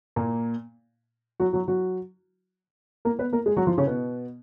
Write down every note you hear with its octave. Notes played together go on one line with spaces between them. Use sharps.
A#2 A#3
F#3 F#4
F#3 F#4
F#3 F#4
A#3 A#4
B3 B4
A#3 A#4
G#3 G#4
F#3 F#4
F3 F4
C#3 C#4
B2 B3